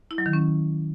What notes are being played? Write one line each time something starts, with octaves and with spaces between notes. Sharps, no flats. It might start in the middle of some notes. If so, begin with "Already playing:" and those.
E4
F#3
D#3
C#4